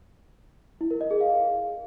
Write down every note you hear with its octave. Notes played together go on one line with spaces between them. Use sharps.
E4
A#4
D#5
G#4
F5